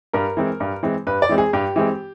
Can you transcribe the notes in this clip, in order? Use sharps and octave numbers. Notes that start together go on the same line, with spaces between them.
G2 A#4
E3 G#3 C4
G2
E3 G#3 C4
G2 B4
D5
E3 G#3 C4
G#4
G2 G4
E3 G#3 C4